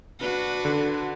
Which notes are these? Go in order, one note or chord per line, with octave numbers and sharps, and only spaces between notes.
D4 F#4 B4
D3